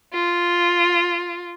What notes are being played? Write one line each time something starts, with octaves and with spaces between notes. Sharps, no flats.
F4